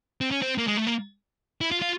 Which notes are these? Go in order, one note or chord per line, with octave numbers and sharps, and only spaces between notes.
C4
C#4
C4
A#3
G#3
A3
A#3
E4
F4
F4